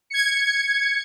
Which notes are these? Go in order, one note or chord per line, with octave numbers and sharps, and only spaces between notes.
G#6 C#7